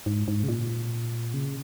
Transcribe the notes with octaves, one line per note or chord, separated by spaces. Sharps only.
G#2
G#2
C#3
A#2
C#3